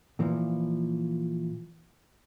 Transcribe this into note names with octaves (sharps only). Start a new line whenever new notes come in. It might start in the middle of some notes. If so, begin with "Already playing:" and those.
A#2 E3 F3